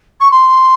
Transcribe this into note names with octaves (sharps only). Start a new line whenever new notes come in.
C#6
C6